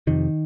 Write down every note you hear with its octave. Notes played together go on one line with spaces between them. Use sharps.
F2 C3 D#3